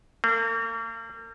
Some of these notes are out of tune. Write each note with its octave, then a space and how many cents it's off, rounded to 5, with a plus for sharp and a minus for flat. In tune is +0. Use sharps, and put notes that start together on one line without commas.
A#3 -40